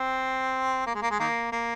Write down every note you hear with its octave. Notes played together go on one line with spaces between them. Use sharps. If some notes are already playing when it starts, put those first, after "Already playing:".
Already playing: C4
A#3
G#3
A#3
G#3
D#3 A#3
A#3